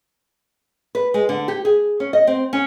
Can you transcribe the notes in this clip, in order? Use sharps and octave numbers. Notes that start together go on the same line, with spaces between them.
B4
G#3
D3
G4
G#4
C#4
D#5
C4
C#4